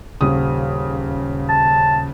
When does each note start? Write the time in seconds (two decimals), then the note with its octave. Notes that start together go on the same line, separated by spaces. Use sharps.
0.21 D#1 C#3 D#6
1.49 A5